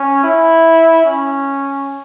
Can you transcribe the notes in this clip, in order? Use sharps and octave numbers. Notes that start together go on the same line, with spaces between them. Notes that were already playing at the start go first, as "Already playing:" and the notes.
Already playing: C#4
E4
C#4